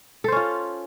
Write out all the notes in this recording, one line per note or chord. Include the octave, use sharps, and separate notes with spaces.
C#4 F4 A4 C5